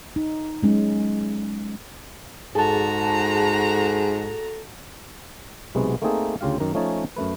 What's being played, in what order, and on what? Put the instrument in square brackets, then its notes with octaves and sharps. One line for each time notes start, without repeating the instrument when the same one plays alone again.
[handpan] D#4
F#3 G#3 C#4 D#4
[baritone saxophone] G#2 [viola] F#4 A#5 [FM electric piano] G#4 A5 [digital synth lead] A4
[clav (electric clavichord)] B1 C3 G#3 B3 F#4
A3 A#3 C4 D#4 G#4 A4
D2 C#3 F4 G4 F5
F#2 D#3 A#5
F3 A3 C#4 D#4 G#5 A5
F#2 A3 B4